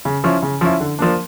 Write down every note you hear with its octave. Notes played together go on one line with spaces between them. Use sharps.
C#3
F3 C#4 E4
C#3
F3 C#4 E4
D3
F3 A#3 D4